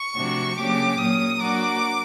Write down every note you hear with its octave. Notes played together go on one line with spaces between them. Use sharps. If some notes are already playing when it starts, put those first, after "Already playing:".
Already playing: C#6
C3 F3 A3 D4 F#4
C#3 F#3 A#3 D4 G4 D6
A#2 F#3 A#3 C#4 D#6
F#3 A#3 D4 F#4 A#4 D6